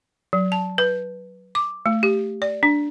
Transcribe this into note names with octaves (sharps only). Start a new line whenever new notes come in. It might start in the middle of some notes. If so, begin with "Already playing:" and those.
F#3
A5
B4
D6
A3
G4
D5
D4